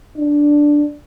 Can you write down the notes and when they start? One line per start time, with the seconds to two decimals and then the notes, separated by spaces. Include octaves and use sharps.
0.17 D4